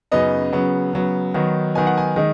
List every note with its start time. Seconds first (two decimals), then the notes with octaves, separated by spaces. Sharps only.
0.12 F#2 C#3 B3 D#4 D#5
0.53 C#3 F#3 B3
0.93 C#3 F#3 B3
1.34 D#3 F#3 B3 D#4
1.75 D#3 F#3 B3 D#4 G#5
1.87 F#5
1.98 G#5
2.16 D#3 G#3 D#4